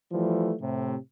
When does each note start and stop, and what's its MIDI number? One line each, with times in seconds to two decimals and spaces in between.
0.12 0.54 52
0.12 0.54 53
0.12 0.54 55
0.12 0.54 57
0.60 0.96 45
0.60 0.96 48